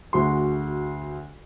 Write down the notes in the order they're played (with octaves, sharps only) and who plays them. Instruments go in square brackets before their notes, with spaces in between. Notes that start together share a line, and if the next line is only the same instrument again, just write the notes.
[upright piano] D2 F#4 G#4 C6